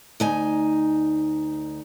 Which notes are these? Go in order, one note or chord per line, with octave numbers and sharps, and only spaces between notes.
D2 D#4 G#5